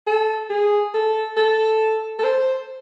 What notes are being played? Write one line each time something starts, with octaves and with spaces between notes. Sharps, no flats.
A4
G#4
A4
A4
A4
C5